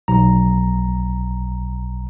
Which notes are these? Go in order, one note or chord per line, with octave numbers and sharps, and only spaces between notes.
B1 A#5